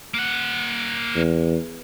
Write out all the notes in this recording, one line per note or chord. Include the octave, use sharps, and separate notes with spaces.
A#3 F#5
E2